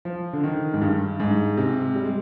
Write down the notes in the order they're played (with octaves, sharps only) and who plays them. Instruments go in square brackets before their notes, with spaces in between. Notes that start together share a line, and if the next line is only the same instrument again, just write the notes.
[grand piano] F3
D3
D#3
G#2
G2
G#2
C3
G3
G#3